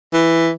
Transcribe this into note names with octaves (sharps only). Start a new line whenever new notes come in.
E3